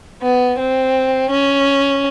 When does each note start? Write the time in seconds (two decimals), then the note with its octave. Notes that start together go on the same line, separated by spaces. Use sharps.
0.22 B3
0.58 C4
1.30 C#4